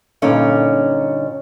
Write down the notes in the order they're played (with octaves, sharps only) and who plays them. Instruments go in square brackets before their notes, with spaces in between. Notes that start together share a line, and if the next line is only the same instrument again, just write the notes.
[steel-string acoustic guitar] G2 A#2 D3 C#4 D#4